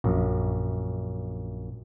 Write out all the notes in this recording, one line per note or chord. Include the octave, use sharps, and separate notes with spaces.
A#1 F#2